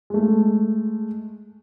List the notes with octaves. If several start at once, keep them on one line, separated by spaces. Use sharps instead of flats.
G#3 A3